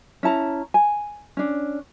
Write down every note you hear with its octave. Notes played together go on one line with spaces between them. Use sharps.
C#4 E4 A5 A#5
G#5
C#4 D4